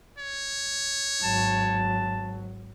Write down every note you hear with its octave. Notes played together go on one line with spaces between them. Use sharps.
C#5
G#1 F#3 A5